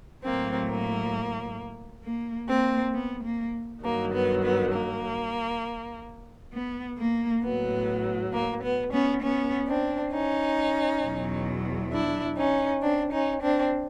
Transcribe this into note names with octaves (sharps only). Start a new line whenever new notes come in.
A2 F#3 A#3 C4
A#3
A#3
A#3 C4
B3
A#3
G2 D#3 F#3 A#3
B3
B3
A#3
B3
A#3
A2 F#3 B3
A#3
B3
B3 C#4
B3 C#4
C4 D4
C#4 D#4
E2 B2 F#3
D4 E4
C#4 D#4
C4 D4
C#4 D#4
C4 D4